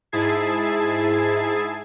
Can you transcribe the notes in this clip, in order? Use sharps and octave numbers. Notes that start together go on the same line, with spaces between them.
G#2 E4 G#4 A5 G#6 C7